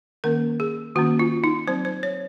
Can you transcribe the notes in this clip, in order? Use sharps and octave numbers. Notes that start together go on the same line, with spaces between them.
D#3 A#3 C#4 A#4
G#4
D#3 A#3 C#4 F#4
F4
D#4
F#3 C4 C5
C5
C#5